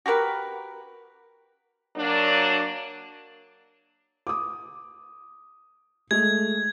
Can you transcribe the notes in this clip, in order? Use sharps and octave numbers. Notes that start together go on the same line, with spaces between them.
F#4 G4 A#4 B4
F#3 A#3 D4
D6 D#6
G#3 A3 G#6